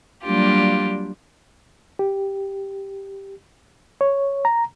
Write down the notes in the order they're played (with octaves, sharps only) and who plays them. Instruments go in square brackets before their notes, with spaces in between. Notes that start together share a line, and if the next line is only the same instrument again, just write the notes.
[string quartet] F#3 G3 A#3 D4 F4 G4
[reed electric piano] G4
C#5
A#5